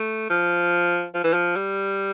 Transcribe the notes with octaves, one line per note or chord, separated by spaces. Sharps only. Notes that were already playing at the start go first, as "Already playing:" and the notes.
Already playing: A3
F3
F3
E3
F3
G3